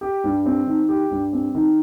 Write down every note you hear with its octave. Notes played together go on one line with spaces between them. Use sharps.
G4
G2
C4
D#3
G4
G2
C4
D#3